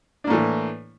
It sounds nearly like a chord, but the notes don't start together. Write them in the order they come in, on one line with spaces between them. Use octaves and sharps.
D4 A#3 A2 E3